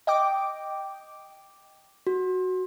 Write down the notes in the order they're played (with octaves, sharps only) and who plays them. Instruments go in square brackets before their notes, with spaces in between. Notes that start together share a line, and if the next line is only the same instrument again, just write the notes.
[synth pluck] D#5 G5 D6
[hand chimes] F#4